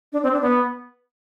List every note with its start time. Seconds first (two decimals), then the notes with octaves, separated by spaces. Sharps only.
0.13 D4
0.23 C4
0.33 D4
0.42 B3